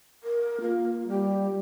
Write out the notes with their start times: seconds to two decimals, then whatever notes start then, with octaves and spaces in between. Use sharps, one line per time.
0.23 A#4
0.61 A#3 F4
1.08 G3 G4